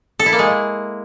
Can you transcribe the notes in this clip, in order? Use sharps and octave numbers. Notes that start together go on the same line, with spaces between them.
A4
E4
A#3
G#3